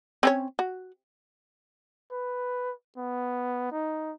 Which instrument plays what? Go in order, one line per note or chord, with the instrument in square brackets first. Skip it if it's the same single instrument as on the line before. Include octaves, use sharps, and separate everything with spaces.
[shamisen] C4 C#4 C#5
F#4
[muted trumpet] B4
B3
D#4